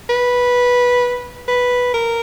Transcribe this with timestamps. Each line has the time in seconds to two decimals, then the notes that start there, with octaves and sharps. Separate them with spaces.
0.09 B4
1.48 B4
1.94 A#4